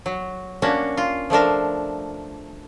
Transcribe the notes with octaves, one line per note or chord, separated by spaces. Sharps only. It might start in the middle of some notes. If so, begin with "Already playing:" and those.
F#3
A#3 C#4 D4 F#4
F4
F3 A3 D4 A#4